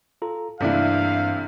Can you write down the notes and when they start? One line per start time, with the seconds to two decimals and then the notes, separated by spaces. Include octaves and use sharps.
0.22 F4 A4 A#5
0.61 G2 C3 E3 A3 A#3 D4 E4 F5